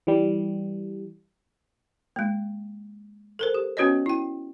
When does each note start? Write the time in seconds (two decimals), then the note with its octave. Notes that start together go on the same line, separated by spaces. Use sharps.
0.07 E3 G3
2.16 G#3 A#3
3.39 A4 A#4 C5
3.54 G4
3.77 B3 C#4 F#4 B4 C#5 D#5
4.06 E4 G5